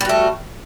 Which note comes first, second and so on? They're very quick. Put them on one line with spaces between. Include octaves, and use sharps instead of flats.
G3 F#4 A3